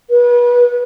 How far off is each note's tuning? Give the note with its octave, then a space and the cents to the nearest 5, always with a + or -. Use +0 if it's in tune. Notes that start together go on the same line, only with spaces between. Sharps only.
B4 -30